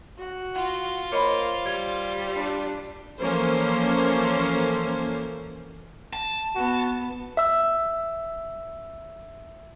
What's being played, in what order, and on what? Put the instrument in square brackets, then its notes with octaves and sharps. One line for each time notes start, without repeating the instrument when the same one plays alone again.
[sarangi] F#4
[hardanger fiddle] F4 [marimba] F#5
[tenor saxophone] A#3 [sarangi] C5 [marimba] C#5 D#5 B5
[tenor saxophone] G3 [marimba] G#6
[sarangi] D4
[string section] E3 F3 A#3 C#4 A4 C5
[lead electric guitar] A5
[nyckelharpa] B3 [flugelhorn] F#4
[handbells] E5 E6